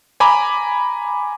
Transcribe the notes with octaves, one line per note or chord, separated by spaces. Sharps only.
G#5 A#5 B5 D6